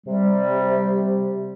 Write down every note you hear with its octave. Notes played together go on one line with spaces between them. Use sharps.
C3 G3